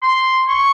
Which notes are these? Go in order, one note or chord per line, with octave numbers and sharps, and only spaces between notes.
C6
C#6